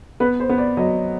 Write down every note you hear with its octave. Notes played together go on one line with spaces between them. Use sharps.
B3 B4
C5
B3
D5
F#3 D#5